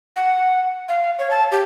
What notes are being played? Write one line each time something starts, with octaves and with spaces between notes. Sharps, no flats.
F#5
F5
C#5
A5
G4